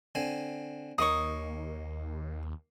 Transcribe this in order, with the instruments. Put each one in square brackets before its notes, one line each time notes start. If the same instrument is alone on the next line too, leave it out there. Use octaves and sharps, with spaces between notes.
[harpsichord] D3 C4 G#5
[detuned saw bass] D#2 [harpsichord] A#3 D#4 C#5 [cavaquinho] C#6 D#6